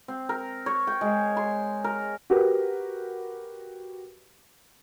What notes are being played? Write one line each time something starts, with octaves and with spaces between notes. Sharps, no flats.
C4
A#4
C#5
G5
G#3
C6
A#4
F#4 G4 A#4 B4